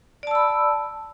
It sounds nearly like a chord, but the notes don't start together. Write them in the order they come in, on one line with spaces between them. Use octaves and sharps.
D5 A5 E6 B5